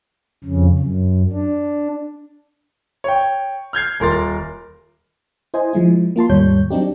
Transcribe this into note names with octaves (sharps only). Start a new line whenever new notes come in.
F2 C#3
F#2
D4
C#5 G5
F6 G6 G#6 C7
D#1 A#4 C6 A6
E4 C5 D#5 G#5
F3 G#3 E4
A#3 F4 A5 C6
D#2 G#2 G3 C#5 G6
F#3 C4 D4 D#4 G4